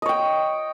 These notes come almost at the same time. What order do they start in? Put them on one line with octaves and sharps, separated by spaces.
D#5 C#5 G5